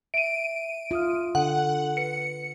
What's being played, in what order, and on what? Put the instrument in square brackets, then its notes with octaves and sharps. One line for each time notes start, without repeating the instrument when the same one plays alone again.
[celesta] E5 [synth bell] D7 D#7
[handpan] F4 [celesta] E5 D#6 F6
[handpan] D3 [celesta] D4 A4 [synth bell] F#5
[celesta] B4 [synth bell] C#7